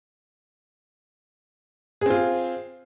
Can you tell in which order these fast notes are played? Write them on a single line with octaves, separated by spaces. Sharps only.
G#4 C4 F4